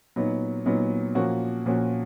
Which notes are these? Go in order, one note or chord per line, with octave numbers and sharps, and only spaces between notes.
A#2 F#3 B3 D#4
A#2 F#3 B3 D#4
A#2 F3 A#3 C#4 F#4
A#2 F3 A#3 C#4 F#4